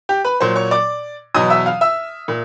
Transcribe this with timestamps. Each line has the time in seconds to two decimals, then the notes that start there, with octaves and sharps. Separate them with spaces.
0.09 G4 G5
0.25 B4 B5
0.40 A#2 F#3 C5 C6
0.56 C#5 C#6
0.71 D5 D6
1.35 E2 B2 F#3 D#5 D#6
1.50 E5 E6
1.66 F5 F6
1.81 E5 E6
2.28 A#2